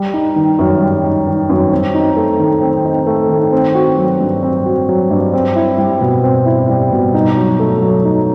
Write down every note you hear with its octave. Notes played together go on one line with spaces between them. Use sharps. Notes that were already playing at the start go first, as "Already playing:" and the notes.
Already playing: G3
D#4
D#3
F#2
G3
D#4
D#3
F#2
C4
D#4
A3
D#3
C4
D#4
A3
D#3
C4
F#4
F#3
G2
C4
F#4
F#3
G2
C4
E4
G3
B2
C4
E4
G3
B2
D#4
F#3
A3
F#3
D#4